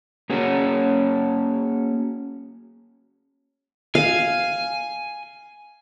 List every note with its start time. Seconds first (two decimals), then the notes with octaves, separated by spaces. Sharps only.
0.30 A#3 C#4 F#4 G#4 A#4
3.95 F5 G#5